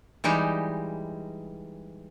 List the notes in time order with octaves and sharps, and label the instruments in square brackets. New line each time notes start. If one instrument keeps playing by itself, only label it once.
[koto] E3 G3 G#3 D#4 G4